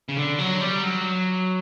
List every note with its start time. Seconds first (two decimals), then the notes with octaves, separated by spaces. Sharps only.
0.09 C#3
0.17 D3
0.39 F#3
0.61 G3
0.84 F#3